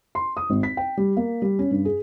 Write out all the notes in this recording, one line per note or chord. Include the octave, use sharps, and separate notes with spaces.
C6
D#6
G#1
B6
G5
G3
A#3
G3
C#4
G2
G#4